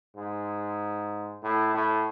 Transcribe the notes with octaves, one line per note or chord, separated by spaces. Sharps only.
G#2
A2
A2